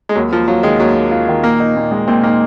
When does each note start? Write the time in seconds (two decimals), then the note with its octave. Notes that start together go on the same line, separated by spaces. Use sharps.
0.09 G#3
0.15 D#2 F#3
0.32 F3 A#3
0.48 F#3 F4
0.63 D#3 G#3
0.80 D#2 F#3
0.96 A#3
1.11 F4
1.28 D#3
1.44 A#2 A#3
1.60 D#4
1.76 A#2
1.92 G#3
2.07 A#2 C4
2.23 A#3 D#4